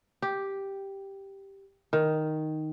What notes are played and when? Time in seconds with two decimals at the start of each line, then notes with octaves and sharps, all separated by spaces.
0.22 G4
1.93 D#3